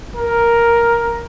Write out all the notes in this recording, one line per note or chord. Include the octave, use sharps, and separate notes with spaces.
A#4